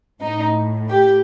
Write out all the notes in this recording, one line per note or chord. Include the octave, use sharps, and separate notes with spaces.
A2 D#4
G4